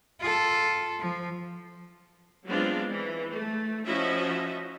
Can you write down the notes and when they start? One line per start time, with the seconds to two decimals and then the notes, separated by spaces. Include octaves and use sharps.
0.20 F4 A4
0.99 F3
2.46 F#3 G#3 B3 C4 D4 F4
2.89 E3
3.31 A3
3.87 F3 C#4 E4 F#4 D#5 E5